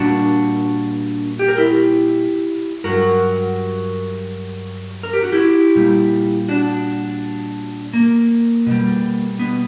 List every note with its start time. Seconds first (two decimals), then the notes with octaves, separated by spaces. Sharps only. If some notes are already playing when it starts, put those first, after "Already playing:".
Already playing: A#2 G3 D4 F#4
1.39 G4
1.48 A#4
1.57 E4 G4
2.84 G2 F#3 F#4 A#4
5.03 A#4
5.13 G4
5.23 F#4
5.32 E4 G4
5.75 A#2 G3
6.48 D4 F#4
7.93 A#3
8.66 B2 G3
9.39 B3